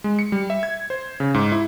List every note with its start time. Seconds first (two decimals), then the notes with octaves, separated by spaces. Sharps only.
0.04 G#3
0.19 C#7
0.32 G3
0.50 E5
0.63 G#6
0.90 C5
1.20 C#3
1.34 G#2
1.52 E4